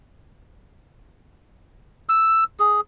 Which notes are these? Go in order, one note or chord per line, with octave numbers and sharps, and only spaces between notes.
E6
G#4